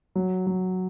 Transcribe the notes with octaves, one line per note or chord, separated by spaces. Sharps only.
F#3
F#3